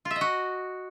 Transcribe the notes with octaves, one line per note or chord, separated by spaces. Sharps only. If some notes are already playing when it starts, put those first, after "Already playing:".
F4
E5
D#5
F#4